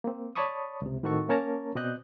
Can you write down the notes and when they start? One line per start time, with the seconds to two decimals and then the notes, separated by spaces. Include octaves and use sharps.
0.04 A#3 C4
0.35 C#5 D5 A5 B5 C#6 D#6
0.82 C#2 C3
1.03 A2 D#3 C4 F#4 A4 C#6
1.29 A#3 C#4 A#4 C#5 A5 A#5
1.75 B2 C4 D5 D#5 F#6 G6